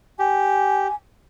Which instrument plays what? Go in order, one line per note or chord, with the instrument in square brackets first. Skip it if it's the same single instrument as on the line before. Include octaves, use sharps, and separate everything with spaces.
[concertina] G4 [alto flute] G#5